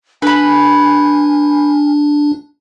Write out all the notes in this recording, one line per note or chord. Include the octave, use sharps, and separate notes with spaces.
D4 B4 G#5 B5